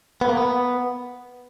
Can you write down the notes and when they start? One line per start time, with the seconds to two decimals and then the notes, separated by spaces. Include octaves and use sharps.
0.21 B3
0.29 A#3
0.37 B3